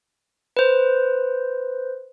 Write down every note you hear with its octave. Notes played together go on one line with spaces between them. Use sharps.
B4 C5